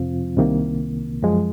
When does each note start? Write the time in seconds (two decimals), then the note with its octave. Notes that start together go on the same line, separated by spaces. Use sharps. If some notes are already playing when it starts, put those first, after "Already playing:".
Already playing: F2 C3 F3 C4 F4
0.37 C2 C3 D#3 A#3
1.22 F#2 F3 G#3